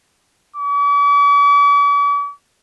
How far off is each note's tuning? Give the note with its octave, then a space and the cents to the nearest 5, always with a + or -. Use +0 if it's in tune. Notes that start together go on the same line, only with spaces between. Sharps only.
D6 -45